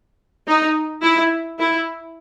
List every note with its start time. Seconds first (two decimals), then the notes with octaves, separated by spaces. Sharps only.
0.48 D#4
1.03 E4
1.59 E4